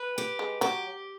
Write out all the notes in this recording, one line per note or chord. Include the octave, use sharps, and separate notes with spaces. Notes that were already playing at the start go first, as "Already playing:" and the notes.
Already playing: B4
G4
G#3
F#3 G4